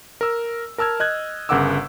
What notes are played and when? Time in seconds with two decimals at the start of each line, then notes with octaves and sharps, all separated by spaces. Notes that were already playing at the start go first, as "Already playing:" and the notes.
0.21 A#4 E6
0.78 A#4 A5 E6 F6 G#6
1.00 D#5 F#6 G#6
1.49 G1 C#3 A#4 F#5 D6 E6